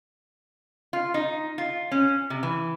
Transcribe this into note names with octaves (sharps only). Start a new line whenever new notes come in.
F4
D#4
F4
C#4
C3
E3